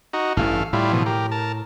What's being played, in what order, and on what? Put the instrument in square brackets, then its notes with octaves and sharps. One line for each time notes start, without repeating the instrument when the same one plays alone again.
[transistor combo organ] D#4 F#4
[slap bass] A1 G2 E3 [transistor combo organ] A3 F5
[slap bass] A2 [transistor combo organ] G3 E4 F4
[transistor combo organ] B2 E3 F3
G4 A#4
A#4 A5